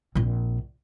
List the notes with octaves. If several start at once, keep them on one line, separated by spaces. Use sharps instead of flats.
A#1 C4